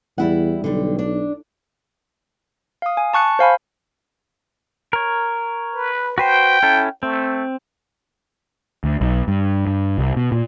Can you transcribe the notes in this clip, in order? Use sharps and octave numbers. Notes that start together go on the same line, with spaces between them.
E2 G3 E4 F#5
B1 D3 G3
D4
F5 D#6
G#5
A5 C#6 F#6 C#7
C5 F5 G#5 B5
A#4 C#5
B4
F#4 B4 C5 G5
C#4 E4 A4
A3 C4
D2
B1
G2
G2
C2
B2
A#2